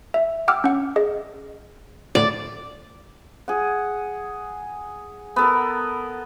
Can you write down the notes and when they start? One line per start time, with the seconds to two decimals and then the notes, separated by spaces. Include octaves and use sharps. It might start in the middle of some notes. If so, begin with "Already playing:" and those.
0.14 E5
0.48 F#5 G5 D6 E6 F6
0.64 C#4 F#5
0.96 G#4 D#5
2.15 D2 A2 D5
3.48 G#4 F#5
5.36 B3 A4 A#4